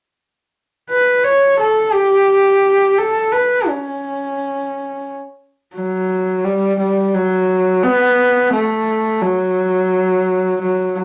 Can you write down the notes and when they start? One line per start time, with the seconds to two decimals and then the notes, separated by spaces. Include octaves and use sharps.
0.90 B4
1.24 C#5
1.60 A4
1.94 G4
2.98 A4
3.32 B4
3.68 C#4
5.75 F#3
6.44 G3
6.79 G3
7.14 F#3
7.83 B3
8.53 A3
9.22 F#3
10.61 F#3